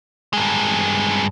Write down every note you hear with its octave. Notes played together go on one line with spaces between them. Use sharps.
G2 G#3